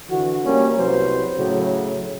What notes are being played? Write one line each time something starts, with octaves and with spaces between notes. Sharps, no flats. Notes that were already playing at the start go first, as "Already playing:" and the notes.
D3 E3 F#4
G3 A#3 C#4
C2 F#3 B4 C5
A2 C#3 F#3